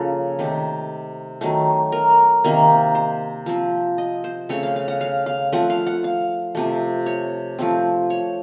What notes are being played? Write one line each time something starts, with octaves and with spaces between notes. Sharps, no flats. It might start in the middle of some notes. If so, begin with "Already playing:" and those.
Already playing: C#3 F3 A#3 A4
C3 D#3 A3
D#3 F#3 A3
A#4
C3 D#3 A#3
C5
F3 C4
D#5
C5
C#3 A3 C4 C#5
F5
F5
F#5
F5
F5
F3 A3 C4 F#5
F5
F#5
F5
C3 F3 A3
C#5
F3 A3 C4
C#5